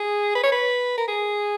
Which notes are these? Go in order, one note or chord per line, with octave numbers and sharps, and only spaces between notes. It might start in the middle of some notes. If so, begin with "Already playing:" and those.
Already playing: G#4
B4
C#5
B4
A#4
G#4